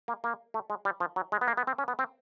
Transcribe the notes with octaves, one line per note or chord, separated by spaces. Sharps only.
A#3
A#3
A3
G#3
G3
F3
F#3
G#3
B3
A#3
B3
C4
C#4
B3
C4